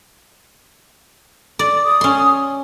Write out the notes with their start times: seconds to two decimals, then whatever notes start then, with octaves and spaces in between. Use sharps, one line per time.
1.59 D5
1.85 D#6
2.01 C#4 C6